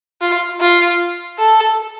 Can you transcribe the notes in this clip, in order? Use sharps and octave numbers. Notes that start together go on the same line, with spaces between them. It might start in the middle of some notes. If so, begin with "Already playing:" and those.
F4
F4
A4